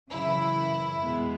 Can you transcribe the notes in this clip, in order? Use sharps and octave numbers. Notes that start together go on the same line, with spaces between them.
F#2 C#3 E3 E4
E2 B2 G#3 B3